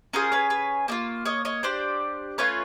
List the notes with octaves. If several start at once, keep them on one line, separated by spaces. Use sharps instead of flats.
C#4 F4 G#4 A#4 C5
B4 C#5
B4 C#5
A#3 D4 F4
C#5 D#5
C#5 D#5
D4 G4 C5 D5
A3 C#4 F4 B4 C#5